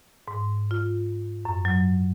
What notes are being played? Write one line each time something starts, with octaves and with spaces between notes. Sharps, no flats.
G#2
F4
F#2
F#3